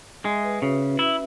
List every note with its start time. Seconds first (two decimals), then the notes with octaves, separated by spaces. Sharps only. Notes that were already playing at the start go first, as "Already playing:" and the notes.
0.24 G#3 E5
0.43 B4
0.62 C#3 F#4
0.80 C#4
0.99 E4 E5